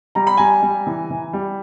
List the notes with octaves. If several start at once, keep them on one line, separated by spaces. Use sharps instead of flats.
G3 A#5
B5
G3 G#5 A#5
G3
E3
E3
G3